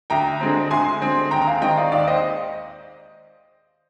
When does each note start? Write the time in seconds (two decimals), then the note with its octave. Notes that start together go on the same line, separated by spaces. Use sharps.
0.10 D2 G5 A#5
0.41 D3 G#3 C4
0.70 D2 G#5 C6
1.01 D3 G#3 C4
1.31 D#2 G5 A#5
1.42 A#5
1.46 F5 G#5
1.62 D#3 G#3 C4 D#5 G5
1.77 D5 F5
1.92 D#2 D5 F5
2.07 C5 D#5